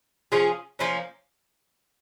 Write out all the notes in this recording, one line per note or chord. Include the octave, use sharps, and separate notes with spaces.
F3 C#4 F4 G#4
F3 A#3 C#4